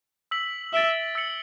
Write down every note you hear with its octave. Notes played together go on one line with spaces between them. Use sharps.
E6 B6 F#7
E5 A6 D7 G7
E6 A6 C#7 F#7